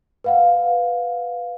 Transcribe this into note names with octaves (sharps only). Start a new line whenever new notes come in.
B4 F5 F#5